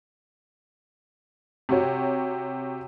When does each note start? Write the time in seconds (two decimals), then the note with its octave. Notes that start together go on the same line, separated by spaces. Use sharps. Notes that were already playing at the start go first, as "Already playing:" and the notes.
1.69 C3 F#4 C#5